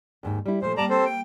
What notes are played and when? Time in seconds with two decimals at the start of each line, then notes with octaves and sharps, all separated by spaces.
0.23 D#2 G#2 D#4
0.45 G3 E4
0.62 A#2 F3 A3 C5
0.77 G3 A#3 D5 A5 A#5
0.90 C4 A4 C5
1.05 G5